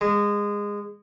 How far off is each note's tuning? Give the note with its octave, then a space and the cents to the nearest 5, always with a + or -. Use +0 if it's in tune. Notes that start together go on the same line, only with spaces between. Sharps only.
G#3 -20